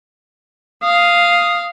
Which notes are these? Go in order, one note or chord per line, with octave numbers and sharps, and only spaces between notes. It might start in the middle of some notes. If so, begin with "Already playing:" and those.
F5 D#6